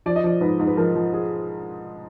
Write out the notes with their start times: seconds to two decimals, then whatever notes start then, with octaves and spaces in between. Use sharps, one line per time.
0.06 F3 D5
0.16 D#5
0.24 F3 D5
0.41 G#2 B4
0.59 G#2
0.67 B4
0.77 F3 A#4
0.95 F3
1.13 G#4